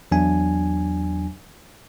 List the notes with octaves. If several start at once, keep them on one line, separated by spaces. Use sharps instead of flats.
E2 F#3 D4 G#5